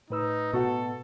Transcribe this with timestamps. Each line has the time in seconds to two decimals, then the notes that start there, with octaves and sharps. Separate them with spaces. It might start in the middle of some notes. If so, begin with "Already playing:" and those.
0.10 A2 D#4 B4 E6
0.53 B2 F#4 A4 F#5